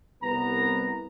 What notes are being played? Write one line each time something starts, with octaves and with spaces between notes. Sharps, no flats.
C2 B3 A#5